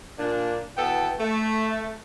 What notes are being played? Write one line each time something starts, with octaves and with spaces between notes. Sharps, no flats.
A#2 D4
B2 E3 B3 A4 G5 A5
A3